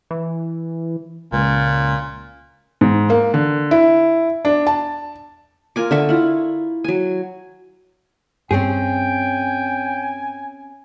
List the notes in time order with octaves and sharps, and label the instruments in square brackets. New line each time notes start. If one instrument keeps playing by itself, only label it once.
[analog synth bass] E3
[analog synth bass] C#2 [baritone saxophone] A#2
[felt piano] G#2
A#3
D3
E4
D4
A5
[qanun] F4 A#4 G#5 D6
D3 E5 C#6
E4 F4
F#3 G#5
[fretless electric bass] G2 [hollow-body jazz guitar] C4 C#4 G#4 [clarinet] G5 [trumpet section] G#5